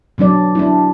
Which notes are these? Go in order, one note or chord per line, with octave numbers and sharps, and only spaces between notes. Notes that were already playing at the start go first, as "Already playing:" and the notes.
B2 F#3 D4 D5
D4 E4